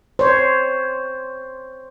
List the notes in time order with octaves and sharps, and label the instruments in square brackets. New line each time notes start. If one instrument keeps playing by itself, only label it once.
[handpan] C5 C#5